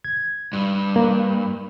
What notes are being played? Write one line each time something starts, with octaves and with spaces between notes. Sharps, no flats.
G#6
G2
A#3